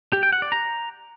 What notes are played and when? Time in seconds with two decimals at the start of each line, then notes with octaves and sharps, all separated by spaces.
0.13 G4
0.23 G5
0.32 F#5
0.42 D5
0.52 A#5